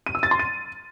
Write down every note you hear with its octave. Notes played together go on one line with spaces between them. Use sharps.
D#7
E6
A6
C6
D#7